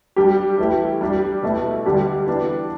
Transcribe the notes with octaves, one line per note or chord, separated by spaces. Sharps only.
G3 D4 G4
E3 A3 E4 G4
G3 D4 G4
B2 A3 E4
D3 G3 D4 G4
E3 B3 D4 G4